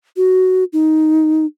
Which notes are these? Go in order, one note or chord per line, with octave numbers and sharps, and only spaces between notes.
F#4
D#4